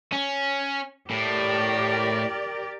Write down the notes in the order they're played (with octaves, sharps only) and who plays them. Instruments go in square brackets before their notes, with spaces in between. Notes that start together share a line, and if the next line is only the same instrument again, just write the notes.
[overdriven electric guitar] C#4
[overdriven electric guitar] A2 [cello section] G4 A#4 D5